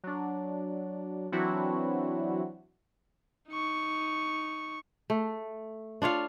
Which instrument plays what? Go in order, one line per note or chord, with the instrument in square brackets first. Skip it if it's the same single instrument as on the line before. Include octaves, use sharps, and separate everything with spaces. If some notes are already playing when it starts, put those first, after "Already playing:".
[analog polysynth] F#3 D4
E3 F#3 C4 D4 E4 F#4
[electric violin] D#4 C#6
[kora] A3
D4 F4 C#5 F5